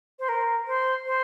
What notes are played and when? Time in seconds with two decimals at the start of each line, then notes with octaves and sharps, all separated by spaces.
0.19 C5
0.29 A#4
0.67 C5
1.06 C5